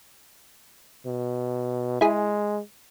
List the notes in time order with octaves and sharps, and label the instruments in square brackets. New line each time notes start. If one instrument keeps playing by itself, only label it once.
[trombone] B2
[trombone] G#3 [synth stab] E4 G#4